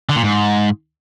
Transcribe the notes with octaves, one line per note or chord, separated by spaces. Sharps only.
D3
A#2
G#2